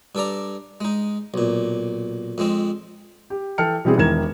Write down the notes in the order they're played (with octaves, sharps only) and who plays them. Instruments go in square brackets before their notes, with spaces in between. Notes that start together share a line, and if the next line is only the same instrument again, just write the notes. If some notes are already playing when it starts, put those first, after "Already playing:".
[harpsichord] G2 A4 D5 A#5
G#3 D#4
B1 A#2
F2 G#3 C4
[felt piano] G4
E3 A4 G5 A5 F6 C#7
B2 E3 G3 C4 E4 G#4
E1 D#3 E3 A#4 G#6 E7